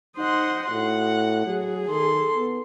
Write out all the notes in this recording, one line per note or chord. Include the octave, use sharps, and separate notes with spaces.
D#4 C5 D#5 F#5 C6
A2 F#4 F#5
F#3 G#4
D#3 A4 C6
B3